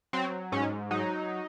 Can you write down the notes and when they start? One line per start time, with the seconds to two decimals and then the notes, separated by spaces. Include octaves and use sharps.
0.13 F#3 C4
0.52 G#2 C#4
0.91 F#3 D#4